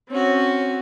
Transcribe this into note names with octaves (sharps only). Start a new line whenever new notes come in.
C4 C#4 F#4